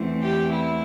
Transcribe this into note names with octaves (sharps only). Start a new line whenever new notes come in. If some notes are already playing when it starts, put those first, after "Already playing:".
Already playing: E2 E3 A3 C4
G4
E4